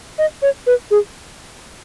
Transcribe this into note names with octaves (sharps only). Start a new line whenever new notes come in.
D#5
C#5
B4
G#4